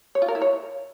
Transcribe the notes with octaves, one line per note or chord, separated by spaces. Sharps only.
C#5
F4
A#4
E4
C#5